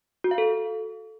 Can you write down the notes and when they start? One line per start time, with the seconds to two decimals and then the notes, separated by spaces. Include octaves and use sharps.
0.24 F#4
0.31 F5
0.38 A4